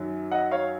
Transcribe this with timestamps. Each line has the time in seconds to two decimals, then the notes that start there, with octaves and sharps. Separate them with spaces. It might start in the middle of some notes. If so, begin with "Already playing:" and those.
Already playing: F#2 D#3 F#3
0.31 D#5 F#5
0.51 C#5 F5